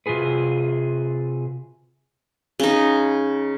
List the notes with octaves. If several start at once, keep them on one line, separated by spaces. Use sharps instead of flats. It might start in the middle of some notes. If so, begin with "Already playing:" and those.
C3 F4 F#4 G#4 B4
C#3 D#4